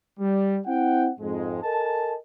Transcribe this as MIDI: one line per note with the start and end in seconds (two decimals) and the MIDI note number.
0.20 0.59 55
0.67 1.10 60
0.67 1.10 64
0.67 1.10 78
0.67 1.10 79
1.20 1.60 41
1.20 1.60 44
1.20 1.60 56
1.63 2.15 69
1.63 2.15 70
1.63 2.15 75
1.63 2.15 80
1.63 2.15 81